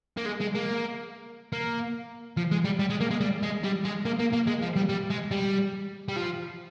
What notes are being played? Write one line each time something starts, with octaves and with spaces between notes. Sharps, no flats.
A#3
G#3
G#3
A#3
A#3
F3
G#3
G3
G3
G#3
A#3
G#3
G3
G#3
G3
G#3
A#3
A#3
A#3
G#3
F3
G3
G3
G#3
G3
G3
F3